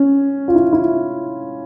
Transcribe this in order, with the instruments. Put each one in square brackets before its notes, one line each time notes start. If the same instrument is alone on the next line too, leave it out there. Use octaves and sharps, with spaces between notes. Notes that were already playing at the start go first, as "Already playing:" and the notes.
Already playing: [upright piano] C#4
F4
E4
E4